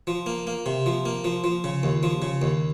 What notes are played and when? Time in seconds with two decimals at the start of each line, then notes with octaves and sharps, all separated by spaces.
0.07 F3
0.26 A#3
0.47 A#3
0.66 C3
0.86 F3
1.05 A#3
1.24 F3
1.44 F3
1.64 C#3
1.83 D#2
2.03 F3
2.22 C#3
2.42 D#2